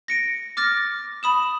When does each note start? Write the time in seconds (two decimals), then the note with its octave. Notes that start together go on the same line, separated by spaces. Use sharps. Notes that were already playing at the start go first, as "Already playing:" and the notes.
0.08 A#6 C#7 D7
0.57 D6 F6 A6 A#6
1.23 B5 D#6 E7